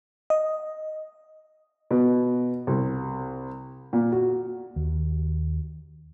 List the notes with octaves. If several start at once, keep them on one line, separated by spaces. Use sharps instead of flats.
D#5
B2
C2
A#2
F#4
D#2